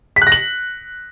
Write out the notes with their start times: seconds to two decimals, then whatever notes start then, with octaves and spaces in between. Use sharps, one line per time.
0.16 B6
0.22 F#6
0.27 A#6
0.32 F#7